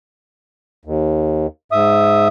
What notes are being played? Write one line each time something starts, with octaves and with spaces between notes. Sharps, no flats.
D#2
G#2 E5 D#6